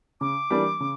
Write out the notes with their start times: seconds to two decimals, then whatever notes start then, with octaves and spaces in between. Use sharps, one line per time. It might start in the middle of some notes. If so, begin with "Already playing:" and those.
0.21 C#3 D6
0.50 E3 G3 A#3 D4
0.80 C#3